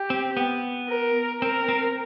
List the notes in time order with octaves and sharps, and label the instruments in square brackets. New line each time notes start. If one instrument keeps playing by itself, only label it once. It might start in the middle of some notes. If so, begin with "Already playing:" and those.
Already playing: [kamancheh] G4
[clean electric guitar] C4
B3
[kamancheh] A#4
[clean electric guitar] C4 [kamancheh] A#4
[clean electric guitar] C4